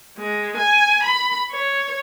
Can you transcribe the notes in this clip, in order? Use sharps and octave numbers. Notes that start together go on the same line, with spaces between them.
G#3
G#5
B5
C#5